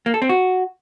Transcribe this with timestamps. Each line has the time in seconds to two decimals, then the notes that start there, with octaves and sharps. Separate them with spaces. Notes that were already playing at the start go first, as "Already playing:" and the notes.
0.06 A#3
0.14 A4
0.22 C4
0.29 F#4